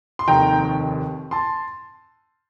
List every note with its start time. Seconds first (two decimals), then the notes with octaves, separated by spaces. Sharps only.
0.19 C6
0.28 F1 D#2 D#3 G5 A#5
1.31 A5 C6